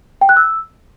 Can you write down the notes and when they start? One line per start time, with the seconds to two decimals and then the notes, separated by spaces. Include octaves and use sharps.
0.21 G5
0.29 F#6
0.37 E6